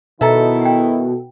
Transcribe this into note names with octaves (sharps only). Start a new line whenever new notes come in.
B2 D#3 D#4 E4 A4 E5 A#5
F#5 G5